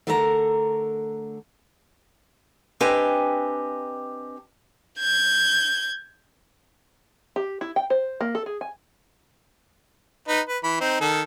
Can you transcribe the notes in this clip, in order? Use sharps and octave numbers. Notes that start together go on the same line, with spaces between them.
D3 A3 A4 A#4 E5 A#5
C4 D4 G4 B4 D#5 G#5
G6 G#6
G4
E4
G5
C5
A#3
A4
G#4
G#5
D#4 B4
B4
E3 B5
C4 D#4
D#3 A4